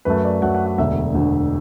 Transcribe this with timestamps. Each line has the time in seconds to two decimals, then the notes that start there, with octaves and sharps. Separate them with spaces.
0.05 F#2 F#3 A3 B4
0.24 D5
0.42 F#2 F#3 A3 F#5
0.55 F#5
0.66 F#5
0.78 E1 D2 D3 E5
1.15 E1 D2 D3